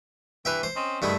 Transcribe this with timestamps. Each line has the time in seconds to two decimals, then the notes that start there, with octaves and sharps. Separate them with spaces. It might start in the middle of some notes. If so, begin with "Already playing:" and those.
0.45 G2 E3 B4 E5 G5
0.63 C5
0.76 C4 C#4 D#5
1.02 G2 D3 D#3 A3 E4 G#4